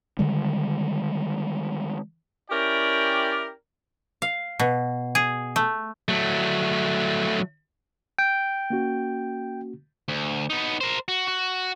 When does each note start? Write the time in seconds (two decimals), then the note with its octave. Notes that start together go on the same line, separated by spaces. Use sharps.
0.19 D3 D#3 G3 G#3
2.50 C#4 E4 G4 A#4 D5 G5
4.22 F5
4.60 B2
5.15 G#4
5.56 A3
6.09 F#3 A3
8.19 G5
8.70 A#3 C#4 F#4
10.08 D2
10.50 B3 D#4
10.81 A#4 C5
11.08 F#4
11.28 F#4